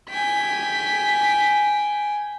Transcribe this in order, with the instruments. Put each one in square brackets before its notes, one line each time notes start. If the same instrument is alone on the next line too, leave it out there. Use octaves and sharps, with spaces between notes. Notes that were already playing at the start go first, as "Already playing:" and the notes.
[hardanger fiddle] G5 G#5 [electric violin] B6